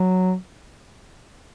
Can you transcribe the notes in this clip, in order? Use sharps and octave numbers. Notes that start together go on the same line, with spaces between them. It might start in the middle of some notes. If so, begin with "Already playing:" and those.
Already playing: F#3